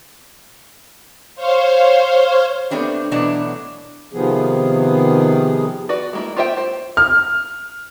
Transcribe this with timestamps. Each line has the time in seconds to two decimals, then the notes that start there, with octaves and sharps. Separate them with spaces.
1.35 C5 C#5 F5
2.71 A3 B3 C4 D4 G4
3.11 B2 E3 F#3 A3 B3 D4
4.13 C3 D#3 F3 B3 G#4
5.89 F#4 B4 D5
6.13 G#3 A#3 E4
6.37 F4 G4 C5 E5 G5
6.57 C5
6.97 F6